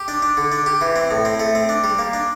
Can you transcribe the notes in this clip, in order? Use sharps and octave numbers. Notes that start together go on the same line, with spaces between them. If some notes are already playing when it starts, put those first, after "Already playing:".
Already playing: G4
D4
D4
D3
D4
G4
E3
C4
A2
C4
A3
C4
D4
G3
A#3
D4